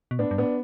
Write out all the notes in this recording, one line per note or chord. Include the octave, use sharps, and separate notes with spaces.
B2
A2 B3 D4
G2
A2 B3 D4